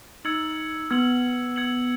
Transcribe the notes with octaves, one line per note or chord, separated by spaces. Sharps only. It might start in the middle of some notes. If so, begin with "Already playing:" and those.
D#4 E6 G#6 C#7 F#7
B3 E6 G#6 C#7 F#7
E6 G#6 C#7 F#7